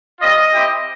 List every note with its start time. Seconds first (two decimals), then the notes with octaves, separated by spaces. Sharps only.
0.21 G3 C4 F4 D#5
0.53 C4 E4 G4